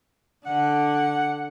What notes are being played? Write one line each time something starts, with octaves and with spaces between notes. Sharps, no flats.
D3 F#5